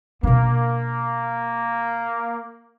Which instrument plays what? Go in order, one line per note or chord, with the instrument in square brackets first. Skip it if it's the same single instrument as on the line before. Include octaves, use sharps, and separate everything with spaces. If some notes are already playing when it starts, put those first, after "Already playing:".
[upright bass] B2 D4 [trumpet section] A#3